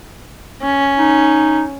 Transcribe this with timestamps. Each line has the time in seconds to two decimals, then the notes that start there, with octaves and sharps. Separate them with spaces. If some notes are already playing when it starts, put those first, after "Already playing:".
0.62 C#4
0.98 D#4